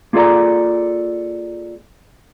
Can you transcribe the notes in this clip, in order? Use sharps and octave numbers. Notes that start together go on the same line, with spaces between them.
A#3 F4 G#4 A4 D5 A#5